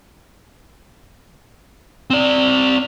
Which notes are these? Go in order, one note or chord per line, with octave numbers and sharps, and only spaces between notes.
C4 D5